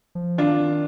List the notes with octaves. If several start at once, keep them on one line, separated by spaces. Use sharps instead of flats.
F3
D#3 D4 F4